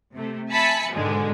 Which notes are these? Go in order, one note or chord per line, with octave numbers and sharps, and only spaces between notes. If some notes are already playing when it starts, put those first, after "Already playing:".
C3 A3
E5 G#5 A5 B5 B6 C#7
G#2 B2 D3 D#3 G#3